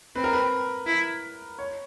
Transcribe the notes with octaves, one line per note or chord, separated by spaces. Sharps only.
C4 B4
A#4
B4
E4
C#5